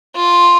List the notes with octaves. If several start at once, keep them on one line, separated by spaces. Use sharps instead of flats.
F4